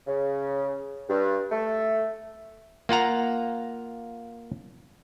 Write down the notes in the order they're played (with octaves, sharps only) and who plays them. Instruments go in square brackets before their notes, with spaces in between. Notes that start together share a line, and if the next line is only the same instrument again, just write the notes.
[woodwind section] C#3
G2
A3
[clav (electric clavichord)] A#3 F4 F#5 A#5